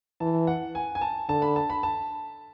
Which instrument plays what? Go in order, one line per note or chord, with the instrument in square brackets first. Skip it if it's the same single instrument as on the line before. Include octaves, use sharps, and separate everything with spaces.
[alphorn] E3 [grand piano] A5
[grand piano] F#5
G#5
G#5
A5
[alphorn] D3 [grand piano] A5
[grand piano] B5
A5
B5
A5